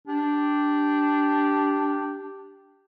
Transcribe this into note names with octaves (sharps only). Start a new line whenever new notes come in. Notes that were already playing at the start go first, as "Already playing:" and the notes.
D4 G4